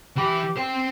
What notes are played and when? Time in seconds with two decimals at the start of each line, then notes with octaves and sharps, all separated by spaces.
0.16 E3 G4 B5
0.56 C5 G5 C6